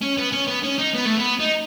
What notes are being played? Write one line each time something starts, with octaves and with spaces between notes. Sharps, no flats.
C#4
B3
C#4
B3
C#4
D#4
B3
A3
B3
D#4